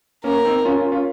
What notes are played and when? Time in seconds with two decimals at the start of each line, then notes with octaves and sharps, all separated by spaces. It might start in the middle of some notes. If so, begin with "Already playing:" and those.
0.24 A#3 C#4 A#4
0.45 C4 D#4
0.65 C#4 F4
0.78 C#4 F4
0.92 C#4 F4